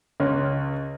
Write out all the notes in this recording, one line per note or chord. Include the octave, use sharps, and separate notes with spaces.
C#2 C#5 C6 F6